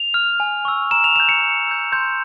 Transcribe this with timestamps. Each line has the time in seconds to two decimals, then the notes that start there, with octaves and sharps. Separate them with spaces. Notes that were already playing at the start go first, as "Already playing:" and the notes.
Already playing: F7
0.14 F6
0.40 G#5
0.65 C#6 E6
0.91 A#5 E7
1.04 F7
1.16 C#6 G6 E7
1.29 C#7
1.42 A#5
1.67 E6 G6
1.92 C6 G6